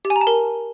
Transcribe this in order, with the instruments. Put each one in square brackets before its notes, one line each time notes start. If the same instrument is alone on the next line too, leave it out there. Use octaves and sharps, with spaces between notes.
[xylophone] G4
G#5
A#5
A5
A#4